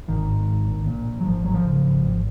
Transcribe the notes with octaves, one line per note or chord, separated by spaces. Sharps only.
G#1 D#3
G#2
G#1
A#1
A#2
A#1
F#3
G#1 F3
G#1 F#3
F3
C#3
G#1
G#1